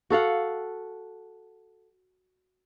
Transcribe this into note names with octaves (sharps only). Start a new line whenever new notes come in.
F#4 A4 F5 F#5